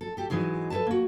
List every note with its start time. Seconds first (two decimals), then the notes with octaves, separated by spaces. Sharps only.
0.01 A4
0.17 G4 A4
0.30 G#2 E3 F#3 G#3 D#4
0.70 A4 B4 C#5 E5 A5
0.86 A#3 F#4